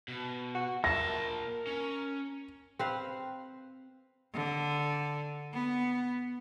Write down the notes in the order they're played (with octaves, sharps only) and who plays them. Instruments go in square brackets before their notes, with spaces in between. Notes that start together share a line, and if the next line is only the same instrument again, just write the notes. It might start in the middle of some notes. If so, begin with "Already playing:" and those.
[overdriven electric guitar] B2
[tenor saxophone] F#4
[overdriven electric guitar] A#2 A5 [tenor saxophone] A#4 [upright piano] A#6
[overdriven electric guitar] C#4
[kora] C4 B4 F5
[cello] D3
B3